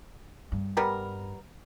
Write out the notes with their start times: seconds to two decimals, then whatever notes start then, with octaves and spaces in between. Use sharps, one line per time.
0.52 G2
0.77 G3 B3 A#4